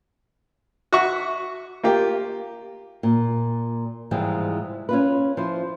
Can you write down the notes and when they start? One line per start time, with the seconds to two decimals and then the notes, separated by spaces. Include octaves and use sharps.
0.93 F#4 E5 C#6
1.83 A#3 F4 G4
3.03 A#2
4.11 G#2 C3 E3 F3 G3 G#3
4.89 C#4 F4 B4
5.37 F3 E4 C5